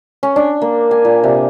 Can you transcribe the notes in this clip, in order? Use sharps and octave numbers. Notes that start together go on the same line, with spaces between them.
C#4
D4
A#3
G#5
A#2
C3